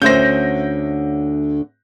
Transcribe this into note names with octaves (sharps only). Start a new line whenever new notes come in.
D2 D3 C#4 C5 E5 G6 A#6